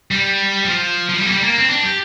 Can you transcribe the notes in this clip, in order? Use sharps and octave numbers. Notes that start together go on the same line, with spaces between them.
G3
F3
F3
G3
A#3
G3
A#3
C4
D4
G4